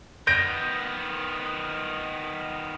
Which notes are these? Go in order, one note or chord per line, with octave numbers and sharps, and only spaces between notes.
D#3 B3 G6 A#6 D7